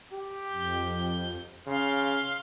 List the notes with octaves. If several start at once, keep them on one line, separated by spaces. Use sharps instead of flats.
G4
F2 G6
C#3 F5 C6